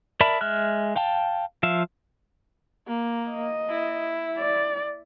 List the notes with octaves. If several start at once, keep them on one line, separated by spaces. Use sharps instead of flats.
A#4 D5 E5 A5 B5
G#3 E5 F6 F#6
F5 G5 A5
F3 E5 F5
A#3
D#5
E4
D5